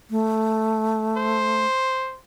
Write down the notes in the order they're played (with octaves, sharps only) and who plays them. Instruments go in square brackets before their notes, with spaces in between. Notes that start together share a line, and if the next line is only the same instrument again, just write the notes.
[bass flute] A3
[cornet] C5